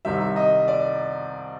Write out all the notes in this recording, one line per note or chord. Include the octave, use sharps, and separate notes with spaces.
C2 C3 D#3 G3 E5
D#5
D5